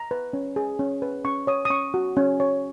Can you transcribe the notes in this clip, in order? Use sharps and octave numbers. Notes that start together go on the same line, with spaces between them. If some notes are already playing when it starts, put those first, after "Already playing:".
Already playing: A#5
B4
C#4
G#4
C#4
B4
C#4 C#6
C#5 D#6
D#6
C#4 C#6
F#4
C#4
C#5